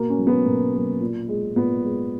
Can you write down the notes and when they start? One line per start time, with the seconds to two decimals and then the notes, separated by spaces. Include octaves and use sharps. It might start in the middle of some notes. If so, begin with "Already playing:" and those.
Already playing: B2 A#3
0.10 C#4
0.18 F#3 A#3
0.27 B3
0.46 B2 A#3
0.74 F#3 A#3
1.01 A#2
1.28 G#3
1.56 A#2 B3
1.83 G#3